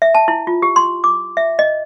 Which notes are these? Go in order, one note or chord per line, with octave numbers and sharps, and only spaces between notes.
E5
A5
E4
F4
G4
C6
D6
E5
D#5